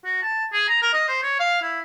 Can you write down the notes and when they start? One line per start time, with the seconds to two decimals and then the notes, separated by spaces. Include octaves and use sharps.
0.05 F#4
0.22 A5
0.53 G#4
0.69 A#5
0.82 A#4
0.93 D#5
1.08 C5
1.23 C#5
1.40 F5
1.62 E4